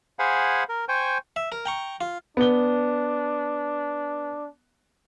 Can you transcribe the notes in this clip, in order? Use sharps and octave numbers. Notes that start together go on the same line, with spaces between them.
G#4 C5 F5 F#5 G#5 B5
A#4
C5 G5 G#5 C#6
E5
A#4
G5 A#5 C#6
F4
B3 D4 G7